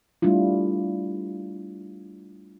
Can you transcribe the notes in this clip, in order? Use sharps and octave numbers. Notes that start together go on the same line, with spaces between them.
G3 A3 D4 E4 F4